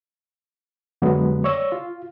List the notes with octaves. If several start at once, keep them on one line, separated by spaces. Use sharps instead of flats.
F2 D3 F#3 G#3 B3
C#5 D5 C#6 E6
F4